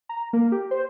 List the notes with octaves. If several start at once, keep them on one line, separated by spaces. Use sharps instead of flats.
A#5
A#3
G4
C5